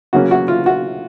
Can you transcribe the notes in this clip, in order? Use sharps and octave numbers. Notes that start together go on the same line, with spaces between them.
C#3 F#3 A#3 C#4 F#4
F#4
F4
F#4